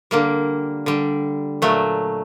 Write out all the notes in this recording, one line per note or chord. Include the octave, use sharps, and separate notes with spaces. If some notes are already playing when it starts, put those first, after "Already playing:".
D3 G3 A#3
D3 G3
A#2 F#3 A3